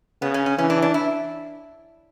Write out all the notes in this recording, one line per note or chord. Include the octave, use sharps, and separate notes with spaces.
C#3 B3
C#4
C#4
E3 C#4
D4
D4
E4